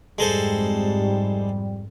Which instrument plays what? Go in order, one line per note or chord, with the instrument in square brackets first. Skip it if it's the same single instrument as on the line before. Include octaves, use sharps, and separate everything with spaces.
[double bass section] F2 G#2 [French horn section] G3 [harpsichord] G#3 A4 C5